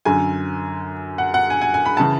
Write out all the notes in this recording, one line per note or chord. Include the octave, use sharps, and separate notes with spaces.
F#2 D3 G#5
F#5
F#5
G#5
G#5
G#5
B5
C#3 E3 A5